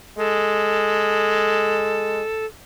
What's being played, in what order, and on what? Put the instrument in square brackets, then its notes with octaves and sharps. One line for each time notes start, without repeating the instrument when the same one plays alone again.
[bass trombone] G#3 [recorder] A4